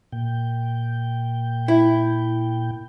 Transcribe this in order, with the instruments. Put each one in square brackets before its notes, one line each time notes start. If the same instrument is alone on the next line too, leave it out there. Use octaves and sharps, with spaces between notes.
[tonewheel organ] A#2 G5
[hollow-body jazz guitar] E4